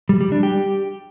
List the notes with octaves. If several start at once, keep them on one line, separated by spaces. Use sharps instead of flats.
G3
G3
D4
G4